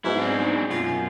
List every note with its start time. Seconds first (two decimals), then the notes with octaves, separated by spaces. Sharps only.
0.05 G#2 F#3 B3 D#4 E4
0.18 C4 D4
0.42 G#5 B5 C#6
0.71 F#2 B2 F4